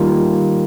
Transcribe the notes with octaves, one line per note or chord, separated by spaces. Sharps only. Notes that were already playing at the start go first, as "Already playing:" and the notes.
Already playing: D#3 G3 A#3 F4